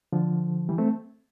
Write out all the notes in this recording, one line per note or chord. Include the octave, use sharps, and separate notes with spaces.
D3 F3
E3 G3
A3 C4